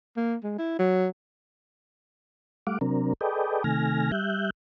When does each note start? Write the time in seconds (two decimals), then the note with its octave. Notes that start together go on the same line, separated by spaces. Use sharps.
0.17 A#3
0.43 G#3
0.58 E4
0.79 F#3
2.67 G3 A3 F5 F#5 D6
2.81 C3 F#3 C4 D4 A#4
3.21 G#4 A4 B4 D5 D#5 G5
3.64 C3 D#3 A3 G#5 F6 A#6
4.12 G3 E5 F#6 G6